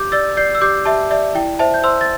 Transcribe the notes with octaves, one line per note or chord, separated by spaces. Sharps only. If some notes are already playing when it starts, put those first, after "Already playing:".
Already playing: G4 D6 G6
D5 E6 A6
D5 G6 C7
E6
G4 D6 G6
G4 E5 A5
D5 E5
E4 G5
C5 E5 A5
G6
C5 C6 E6
A6